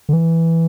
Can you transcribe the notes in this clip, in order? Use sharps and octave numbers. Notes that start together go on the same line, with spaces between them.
D3
E3